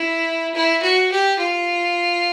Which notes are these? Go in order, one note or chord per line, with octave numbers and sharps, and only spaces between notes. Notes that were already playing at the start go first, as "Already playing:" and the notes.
Already playing: E4
E4
F#4
G4
F4